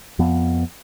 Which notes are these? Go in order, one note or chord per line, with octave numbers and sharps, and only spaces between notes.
F2 F3 B3